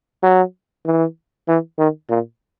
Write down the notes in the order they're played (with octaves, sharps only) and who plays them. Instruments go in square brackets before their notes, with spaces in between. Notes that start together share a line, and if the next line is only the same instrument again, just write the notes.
[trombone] F#3
E3
E3
D#3
A#2